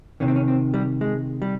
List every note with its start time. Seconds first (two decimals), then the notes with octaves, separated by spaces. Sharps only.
0.20 C3 D#3 C#4
0.28 C4
0.36 C#4
0.48 C4
0.74 G3
1.01 G#3
1.42 G3